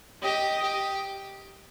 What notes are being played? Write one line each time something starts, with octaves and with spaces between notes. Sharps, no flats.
G4 D#5
G4